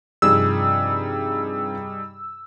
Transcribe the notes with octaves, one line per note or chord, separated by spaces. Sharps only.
G2 C3 F3 G3 D#4 G#4 E6